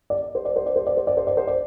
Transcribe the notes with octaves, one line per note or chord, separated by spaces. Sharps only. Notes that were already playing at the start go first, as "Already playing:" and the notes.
D5
C5
D5
C5
D5
C5
D5
C5
D5
C5
D5
C5
D5